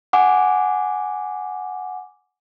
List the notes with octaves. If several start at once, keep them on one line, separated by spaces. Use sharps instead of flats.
F#5 G#5 D6